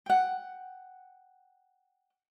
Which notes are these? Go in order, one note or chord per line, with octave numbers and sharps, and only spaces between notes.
F#5 G5